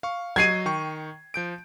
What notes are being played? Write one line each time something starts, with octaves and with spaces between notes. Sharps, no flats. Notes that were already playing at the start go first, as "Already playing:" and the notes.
F5 C#6
F#3 F#4 D#5 G#6 C7 D#7
D#3 G5 C#6
F3 G6 D7